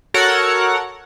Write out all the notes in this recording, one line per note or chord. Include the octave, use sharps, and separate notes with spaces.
F#4 A4 A#4 C#5 F#5